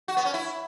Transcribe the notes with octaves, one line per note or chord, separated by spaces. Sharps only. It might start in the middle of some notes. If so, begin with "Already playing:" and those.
F#4
B3
C#4
E4